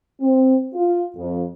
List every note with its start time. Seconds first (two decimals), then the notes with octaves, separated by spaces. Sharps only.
0.20 C4
0.73 F4
1.16 F2